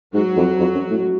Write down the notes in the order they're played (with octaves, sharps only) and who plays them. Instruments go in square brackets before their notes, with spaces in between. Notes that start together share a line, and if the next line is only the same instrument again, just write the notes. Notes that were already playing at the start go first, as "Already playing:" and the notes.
[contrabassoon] G#2 [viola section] F#3 F#4
[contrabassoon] F2
F2
F#2
A2